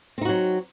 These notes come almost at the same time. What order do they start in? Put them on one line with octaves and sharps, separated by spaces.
C4 D#4 F#4 F#3